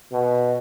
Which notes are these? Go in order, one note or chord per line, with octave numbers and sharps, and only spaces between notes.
B2